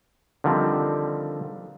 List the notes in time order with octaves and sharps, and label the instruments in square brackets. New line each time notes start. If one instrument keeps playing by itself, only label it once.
[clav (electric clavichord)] D3 D#3 F3 G3 C4